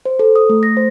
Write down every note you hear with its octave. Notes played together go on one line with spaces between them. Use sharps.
C5
A4
D#6
A3
A#6
C5